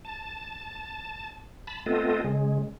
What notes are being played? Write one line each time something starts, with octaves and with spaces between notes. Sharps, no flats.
A5
A5 B5
A3 B3 C4 F4 A4 D#5
C#3 G#3